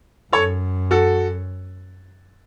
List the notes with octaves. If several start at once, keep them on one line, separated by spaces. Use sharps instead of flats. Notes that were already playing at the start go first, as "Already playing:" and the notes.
F#2 A4 C#5
F#4 A4